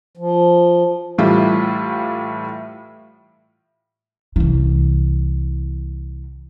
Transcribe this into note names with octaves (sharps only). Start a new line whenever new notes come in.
F3
A2 E3 G3 A3 F4
C2 E3